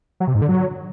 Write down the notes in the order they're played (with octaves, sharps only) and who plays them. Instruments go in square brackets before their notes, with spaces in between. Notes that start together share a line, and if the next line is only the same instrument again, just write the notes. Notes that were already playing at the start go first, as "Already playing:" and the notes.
[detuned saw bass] F#3
C3
G#2
D3
F#3